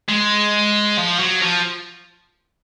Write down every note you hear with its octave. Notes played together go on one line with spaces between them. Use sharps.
G#3
F3
F#3
F3